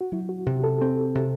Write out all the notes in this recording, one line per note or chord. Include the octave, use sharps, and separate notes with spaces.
F#4
F#3 E4
F#4
C3 G4
A4
C4
C3